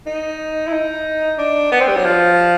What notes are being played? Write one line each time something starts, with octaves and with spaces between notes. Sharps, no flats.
D#4
E4
D#4
D4
B3
C4
G3
F#3
F3